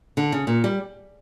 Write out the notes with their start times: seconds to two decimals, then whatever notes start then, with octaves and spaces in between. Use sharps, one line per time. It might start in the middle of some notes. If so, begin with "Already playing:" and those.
0.17 D3
0.32 C#3
0.47 A#2
0.64 G3